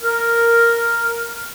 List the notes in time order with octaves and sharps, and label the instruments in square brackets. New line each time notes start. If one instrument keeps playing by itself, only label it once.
[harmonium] A#4